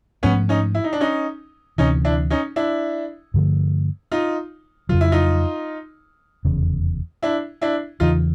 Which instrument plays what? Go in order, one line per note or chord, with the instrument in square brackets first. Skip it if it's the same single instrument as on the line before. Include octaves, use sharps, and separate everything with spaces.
[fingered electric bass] G#2 F3 A3 [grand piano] B3 C#4
[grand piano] C#4 D#4
E4
D#4
D4
C#4 D#4
[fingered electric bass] D2 C3 E3 [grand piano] C#4 D#4
[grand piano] D4 E4
C#4 D#4
D4 E4
[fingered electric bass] G2 D3 F3 A3
[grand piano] D#4 F4
[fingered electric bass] F2 C#3 F#3 [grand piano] F4
[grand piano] E4
D#4 F4
[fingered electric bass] F1 E2 C#3
[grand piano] D4 E4
D4 E4
[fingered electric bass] E2 C#3 E3 [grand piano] D#4 F4